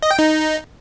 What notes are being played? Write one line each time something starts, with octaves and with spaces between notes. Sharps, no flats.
D#5
G5
D#4